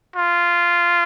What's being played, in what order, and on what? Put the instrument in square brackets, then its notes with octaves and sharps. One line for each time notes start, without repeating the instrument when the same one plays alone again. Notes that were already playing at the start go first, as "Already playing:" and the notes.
[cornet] F4